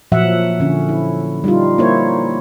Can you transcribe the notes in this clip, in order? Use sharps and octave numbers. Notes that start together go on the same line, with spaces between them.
A#2 F3 F#3 E5 F#5
D3 C#4
E4
G3 D#4 F4
A#3 E4 C5 C#5